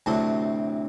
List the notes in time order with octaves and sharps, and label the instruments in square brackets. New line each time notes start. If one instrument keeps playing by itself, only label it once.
[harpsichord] D2 A2 C3 F#3